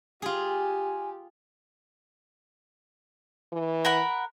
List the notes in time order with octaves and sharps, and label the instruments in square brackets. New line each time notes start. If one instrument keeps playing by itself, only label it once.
[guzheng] F4 G#4 [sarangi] G4 [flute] G#5
[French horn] E3
[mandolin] A#4 F#5 B5